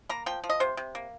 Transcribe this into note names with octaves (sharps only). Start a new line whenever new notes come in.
A#3 A#5
F3 G5
F3
D#5
C3 C5
C3
A#3